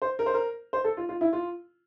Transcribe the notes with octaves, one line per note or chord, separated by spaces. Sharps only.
C5
A#4
C5
A#4
C5
A4
F4
F4
E4
F4